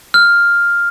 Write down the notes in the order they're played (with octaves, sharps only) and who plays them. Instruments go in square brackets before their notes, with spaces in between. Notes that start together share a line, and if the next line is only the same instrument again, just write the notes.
[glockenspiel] F6